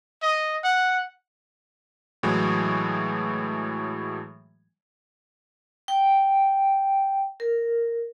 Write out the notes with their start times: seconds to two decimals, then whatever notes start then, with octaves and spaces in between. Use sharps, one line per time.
0.22 D#5
0.64 F#5
2.23 A2 E3 F#3 G#3
5.88 G5
7.40 A#4